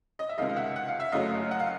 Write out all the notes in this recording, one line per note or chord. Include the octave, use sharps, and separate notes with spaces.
D#5
E5
C#2 C3 D#3 G#3 D#5 F5
F5
E5 F#5
F#5
F5
E5
F#1 F#2 C#3 F#3 A3 D#5 F5
F#5
F5